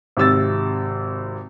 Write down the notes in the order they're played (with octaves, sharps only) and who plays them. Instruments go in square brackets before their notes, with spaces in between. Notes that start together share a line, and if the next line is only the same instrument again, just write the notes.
[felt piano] G#1 C3 E6 A6